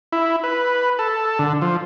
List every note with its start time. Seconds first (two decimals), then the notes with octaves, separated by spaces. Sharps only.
0.12 E4
0.44 B4
0.99 A4
1.39 D3
1.61 F3